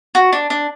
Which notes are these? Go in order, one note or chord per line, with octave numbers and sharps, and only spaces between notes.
F#4
D4
D4